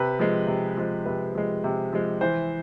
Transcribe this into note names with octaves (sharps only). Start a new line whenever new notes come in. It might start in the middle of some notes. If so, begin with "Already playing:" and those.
Already playing: C3 B4
F3 G#3
C3
F3 G#3
C3 B4
F3 G#3
C3
F3 G#3
E3 C5